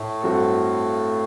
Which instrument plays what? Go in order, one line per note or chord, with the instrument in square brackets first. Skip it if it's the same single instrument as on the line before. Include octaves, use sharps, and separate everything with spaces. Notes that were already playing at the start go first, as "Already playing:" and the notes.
Already playing: [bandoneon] A2 A3
[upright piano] G2 F#3 C4 F#4 A4